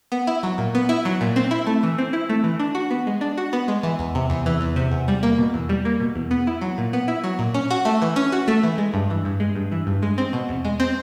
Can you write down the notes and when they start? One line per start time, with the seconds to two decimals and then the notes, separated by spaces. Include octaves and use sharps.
0.12 B3
0.27 E4
0.43 F#3
0.58 A#2
0.75 B3
0.89 E4
1.05 F#3
1.21 A#2
1.36 C4
1.51 E4
1.67 A3
1.83 E3
1.98 C4
2.13 E4
2.29 A3
2.44 E3
2.59 D4
2.75 F#4
2.90 B3
3.07 G#3
3.21 D4
3.37 F#4
3.53 B3
3.68 G#3
3.83 E3
3.99 E2
4.15 C3
4.30 E2
4.46 E3
4.61 E2
4.76 C3
4.92 E2
5.08 G3
5.23 A#3
5.38 B2
5.54 E2
5.69 G3
5.85 A#3
6.00 B2
6.15 E2
6.31 B3
6.47 E4
6.61 F#3
6.78 A#2
6.93 B3
7.08 E4
7.24 F#3
7.39 A#2
7.54 C#4
7.70 F#4
7.85 A3
8.02 E3
8.16 C#4
8.32 F#4
8.48 A3
8.63 E3
8.78 G#3
8.94 G2
9.10 E3
9.25 G2
9.40 G#3
9.55 G2
9.72 E3
9.87 G2
10.02 G#3
10.18 C4
10.33 B2
10.49 E2
10.65 G#3
10.80 C4